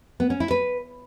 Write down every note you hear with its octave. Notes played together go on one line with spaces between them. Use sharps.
B3
C#4
E4
B4